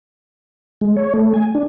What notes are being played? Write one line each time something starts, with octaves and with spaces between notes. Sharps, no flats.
G#3
C#5
A3
G#5
D4